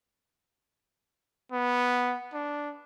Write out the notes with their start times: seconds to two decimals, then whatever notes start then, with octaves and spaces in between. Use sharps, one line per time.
1.52 B3
2.33 D4